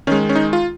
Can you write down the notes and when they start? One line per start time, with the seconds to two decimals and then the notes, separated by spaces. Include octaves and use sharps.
0.07 D#3 G#3 C#4
0.29 C#4
0.35 D#4
0.53 F4